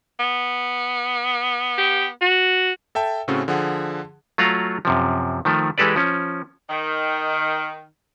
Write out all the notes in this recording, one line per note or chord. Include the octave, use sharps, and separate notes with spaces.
B3
G4
F#4
A4 E5 G5 A5
A2 C#3 C4 C#4 F#4 A4
D3 F3 G#4 F#5
F#3 A3 F4 F5 F#5 A#5
F#2 C3 F3
D#3 F3 A3
E3 G#3 G4 A4 B4 D5
F3 C#4
D#3